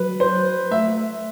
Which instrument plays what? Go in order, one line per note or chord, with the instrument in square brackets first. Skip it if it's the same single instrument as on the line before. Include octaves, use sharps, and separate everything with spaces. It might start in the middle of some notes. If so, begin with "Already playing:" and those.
Already playing: [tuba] F#3 [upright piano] B4
[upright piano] C5
[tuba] A3 [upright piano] E5